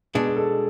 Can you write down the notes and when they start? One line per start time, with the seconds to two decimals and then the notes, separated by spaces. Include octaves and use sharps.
0.15 B2 G#3 D4 G#4
0.27 G#4
0.36 A4